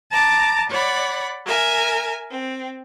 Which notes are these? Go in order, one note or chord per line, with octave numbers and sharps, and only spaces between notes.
A5 A#5 D6
C#5 D5 F#5 B5
A#4 E5 G#5
C4